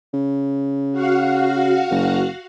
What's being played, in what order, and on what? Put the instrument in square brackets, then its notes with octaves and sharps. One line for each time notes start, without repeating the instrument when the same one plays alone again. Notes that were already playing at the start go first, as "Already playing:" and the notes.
[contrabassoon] C#3
[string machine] F#4 F5 F#5
[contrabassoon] F#1